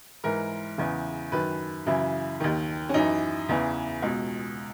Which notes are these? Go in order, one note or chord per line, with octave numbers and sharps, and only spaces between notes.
G#2 E3 A#4
E2 C#3 E3
F#2 D#3 B4
F#2 C#3 E3 E4
D#2 D#3
C#4
F#2 E3 D#4
E2 C#3 E3
C#2 B2